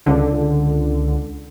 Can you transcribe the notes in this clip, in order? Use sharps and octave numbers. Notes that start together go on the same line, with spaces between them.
C#2 D3